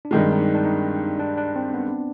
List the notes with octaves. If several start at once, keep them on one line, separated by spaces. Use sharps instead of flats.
D4
G2 D#3 G#3 C4
D#4
D4
D4
D#4
D4
D4
C4
B3